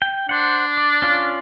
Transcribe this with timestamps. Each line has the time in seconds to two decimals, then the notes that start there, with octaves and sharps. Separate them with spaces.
0.02 G5
0.29 D4 C5 F#5
0.77 D5
1.02 C#4 F4 D5